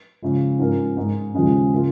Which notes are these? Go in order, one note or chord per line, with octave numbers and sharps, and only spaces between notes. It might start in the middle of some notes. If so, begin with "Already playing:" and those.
C#3 F3 G#3
G#2 F3 C#4 A#4
G#2 G#3 D#4 A#4
D#2 C#3 F3 G#3 C#4
C#3 A#3 F4